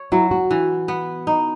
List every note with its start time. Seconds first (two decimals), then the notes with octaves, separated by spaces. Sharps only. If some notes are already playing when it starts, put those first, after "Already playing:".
Already playing: C#5
0.12 F#3 E4
0.31 F#4
0.51 E3
0.88 B3
1.27 D#4